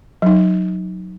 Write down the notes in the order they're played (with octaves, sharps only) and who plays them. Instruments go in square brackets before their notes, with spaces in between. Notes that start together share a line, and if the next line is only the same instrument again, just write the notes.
[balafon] F#3 D#4